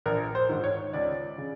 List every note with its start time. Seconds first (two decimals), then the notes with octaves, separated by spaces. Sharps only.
0.06 A#1 A#4
0.35 C5
0.49 G#2 D#3
0.64 C#5
0.93 C#2 D5
1.38 C#3